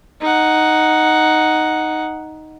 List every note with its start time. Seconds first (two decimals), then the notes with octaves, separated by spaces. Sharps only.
0.21 D#4 F#5